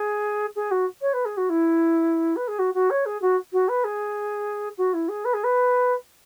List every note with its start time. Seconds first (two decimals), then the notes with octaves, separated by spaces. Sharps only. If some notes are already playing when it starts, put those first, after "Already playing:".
Already playing: G#4
0.56 G#4
0.71 F#4
1.01 C#5
1.13 B4
1.25 G#4
1.37 F#4
1.49 E4
2.36 B4
2.48 G#4
2.59 F#4
2.74 F#4
2.90 C#5
3.06 G#4
3.22 F#4
3.53 F#4
3.69 B4
3.84 G#4
4.78 F#4
4.94 E4
5.09 G#4
5.25 B4
5.34 G#4
5.44 B4